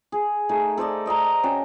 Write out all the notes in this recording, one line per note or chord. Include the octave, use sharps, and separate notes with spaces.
G#4
A3 D#4 G#4
A4 C5 D5 D#5
D5 D#5 F5 A#5
C#4 F#4 G5